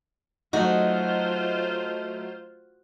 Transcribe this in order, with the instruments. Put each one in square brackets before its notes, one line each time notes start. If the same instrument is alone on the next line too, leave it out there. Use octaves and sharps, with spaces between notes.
[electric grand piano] F#3 A3 D#5 [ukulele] D#4 [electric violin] F4 C5 [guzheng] F#4